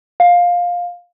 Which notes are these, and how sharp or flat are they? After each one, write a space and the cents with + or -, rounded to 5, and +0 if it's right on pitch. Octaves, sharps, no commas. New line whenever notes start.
F5 +15